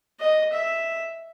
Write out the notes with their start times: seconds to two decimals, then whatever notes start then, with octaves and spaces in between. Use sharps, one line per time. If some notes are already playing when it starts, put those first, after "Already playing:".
0.20 D#5
0.53 E5